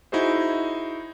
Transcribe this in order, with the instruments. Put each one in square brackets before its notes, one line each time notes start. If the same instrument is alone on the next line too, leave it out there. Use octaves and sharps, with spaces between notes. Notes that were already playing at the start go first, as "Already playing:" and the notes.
[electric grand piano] D#4 E4 F#4 G#4 C5